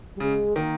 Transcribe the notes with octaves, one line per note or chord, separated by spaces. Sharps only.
G3
C#3 G#3
D#3 A#3